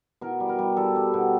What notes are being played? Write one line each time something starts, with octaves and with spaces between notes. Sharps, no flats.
B2 A#4
G3
A#4
G3
G3 A4
G3
B2